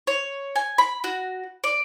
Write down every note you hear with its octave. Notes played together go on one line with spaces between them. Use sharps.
C#5
G#5
B5
F#4
D5